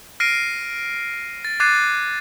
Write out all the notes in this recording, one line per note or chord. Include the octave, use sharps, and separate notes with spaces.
F6 A#6 C7 D7 D#7
A6
D6 F#6 G#6 A6 C7 D#7